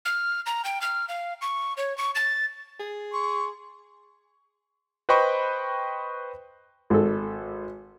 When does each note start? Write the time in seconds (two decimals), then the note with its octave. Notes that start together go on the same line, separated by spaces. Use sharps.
0.05 F6
0.46 A#5
0.65 G5
0.82 F6
1.09 F5
1.42 C#6
1.77 C#5
1.98 C#6
2.15 A6
2.80 G#4
3.13 C6 C#6
5.09 B4 C5 D#5 G5 B5 C#6
6.90 G#1 A4